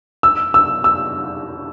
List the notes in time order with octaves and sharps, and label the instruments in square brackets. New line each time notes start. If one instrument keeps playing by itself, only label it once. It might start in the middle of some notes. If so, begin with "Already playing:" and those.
[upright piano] E6
E6
E6